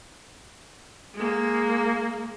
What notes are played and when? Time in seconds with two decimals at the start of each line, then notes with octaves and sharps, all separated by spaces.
1.14 G#3 A#3